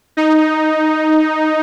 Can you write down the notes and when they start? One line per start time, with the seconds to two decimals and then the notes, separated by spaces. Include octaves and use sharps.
0.17 D#4